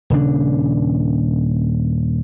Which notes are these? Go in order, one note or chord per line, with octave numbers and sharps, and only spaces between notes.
D#1 C#3 D4